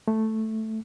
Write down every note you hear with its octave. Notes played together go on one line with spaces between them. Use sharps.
A3